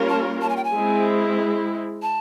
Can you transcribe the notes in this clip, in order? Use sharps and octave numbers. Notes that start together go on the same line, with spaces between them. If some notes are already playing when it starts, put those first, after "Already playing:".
Already playing: G3 A#3 C#4 F4 A#4
A5
A5
G#5
G5
G#5
G#3 C4 E4
A5